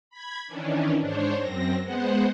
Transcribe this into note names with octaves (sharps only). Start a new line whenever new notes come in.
B5 G#6
D#3 E3 C#4 D4
G#2 D4 C5 C#5
F#2 C4 A#6
G#3 B3 C5 F#5